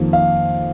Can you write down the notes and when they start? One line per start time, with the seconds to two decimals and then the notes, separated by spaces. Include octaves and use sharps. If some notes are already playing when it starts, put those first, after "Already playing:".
Already playing: F2 D#3 A#3
0.13 F5